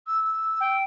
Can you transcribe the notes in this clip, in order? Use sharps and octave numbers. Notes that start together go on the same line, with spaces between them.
E6
G5